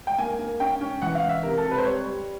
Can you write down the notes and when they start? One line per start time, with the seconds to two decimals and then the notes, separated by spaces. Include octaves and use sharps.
0.07 G5
0.18 A#3 G#5
0.39 A#3
0.60 C#4 G5
0.81 C#4
1.02 E3 F#5
1.15 F5
1.23 E3
1.29 E5
1.43 C3 A#4
1.57 A4
1.64 C3
1.71 B4
1.78 C5
1.85 G3 C#5
2.06 G3